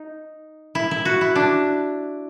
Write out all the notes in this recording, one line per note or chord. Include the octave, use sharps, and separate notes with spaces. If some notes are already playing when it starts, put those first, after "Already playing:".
Already playing: D#4
E4
E4
F#4
E4
D4